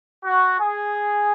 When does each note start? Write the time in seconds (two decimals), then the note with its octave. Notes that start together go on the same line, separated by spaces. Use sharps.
0.25 F#4
0.60 G#4